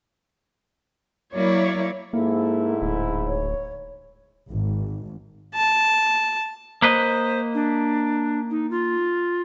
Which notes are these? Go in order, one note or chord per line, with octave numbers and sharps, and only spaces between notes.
F#3 A#3 E4 C#5 D5
G#2 A#3 E4 A4
D1
C#5
G#1
A5
A#3 B4 C5 D#5
D4
D#4
F4